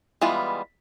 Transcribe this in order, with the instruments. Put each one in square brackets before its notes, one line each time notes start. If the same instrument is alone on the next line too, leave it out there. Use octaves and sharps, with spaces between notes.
[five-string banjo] E3 G3 G#3 B3 F4